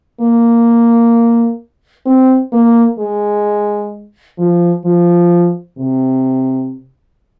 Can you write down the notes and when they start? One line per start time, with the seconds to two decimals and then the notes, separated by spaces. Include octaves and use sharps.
0.20 A#3
2.06 C4
2.52 A#3
2.99 G#3
4.38 F3
4.85 F3
5.78 C3